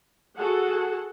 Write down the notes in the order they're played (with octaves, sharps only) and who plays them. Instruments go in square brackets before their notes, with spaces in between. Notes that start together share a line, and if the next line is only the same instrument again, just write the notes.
[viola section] F#4 G#4 A4 F#5